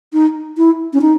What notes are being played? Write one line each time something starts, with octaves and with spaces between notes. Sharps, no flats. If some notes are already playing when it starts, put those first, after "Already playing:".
D#4
E4
C#4
D#4